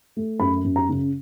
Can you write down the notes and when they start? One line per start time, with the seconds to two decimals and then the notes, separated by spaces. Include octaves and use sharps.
0.17 A3
0.40 F#2 B5
0.64 F#2
0.76 A#5
0.89 C#3